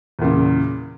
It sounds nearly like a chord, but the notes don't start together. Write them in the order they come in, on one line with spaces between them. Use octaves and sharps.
E2 A#2 C#3